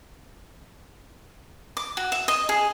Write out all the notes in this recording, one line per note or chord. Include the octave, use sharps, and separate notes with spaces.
D6
F#4
E5
D#5
G#4